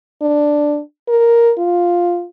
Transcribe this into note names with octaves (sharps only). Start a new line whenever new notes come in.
D4
A#4
F4